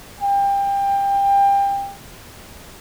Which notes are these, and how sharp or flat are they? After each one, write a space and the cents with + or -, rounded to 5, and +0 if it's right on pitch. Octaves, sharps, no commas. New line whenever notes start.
G5 +25